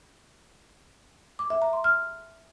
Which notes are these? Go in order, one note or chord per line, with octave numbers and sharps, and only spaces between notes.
D6
E5
A#5
C6
F6